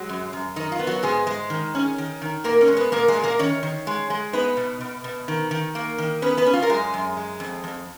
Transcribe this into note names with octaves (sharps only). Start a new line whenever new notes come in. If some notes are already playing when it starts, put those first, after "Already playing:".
Already playing: F#3 G#3 F#4
F#2
F#2
D#3 D#4
F4
B3
F#3 F#4
G#2 G#3 G#4
G#3
D#3
C#4
D#3
D#3
A#2 A#3 A#4
C#4 C#5
G#3
B3 B4
A#2 A#3 A#4
G#3 G#4
A#2
A#3 A#4
D#3 C#4 C#5
D#3
G#3
G#3
B3 D#4 B4
B2
B2
B2
D#3
D#3
A#3
D#3
B3 C#4 B4
B3 B4
C#4
F4
A#4
F#2 G#3 G#4
F#2
G#3
F2
F2